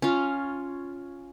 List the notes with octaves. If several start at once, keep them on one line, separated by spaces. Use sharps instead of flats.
C#4 F4